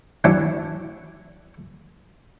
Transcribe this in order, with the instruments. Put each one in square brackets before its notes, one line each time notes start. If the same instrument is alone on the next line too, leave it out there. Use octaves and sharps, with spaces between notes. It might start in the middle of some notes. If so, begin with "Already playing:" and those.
[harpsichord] E3 F#3 C#4 D4